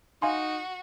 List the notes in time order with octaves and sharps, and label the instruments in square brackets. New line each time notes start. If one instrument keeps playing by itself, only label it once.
[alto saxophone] D#4 [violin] F#4 [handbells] F5 G#5 C6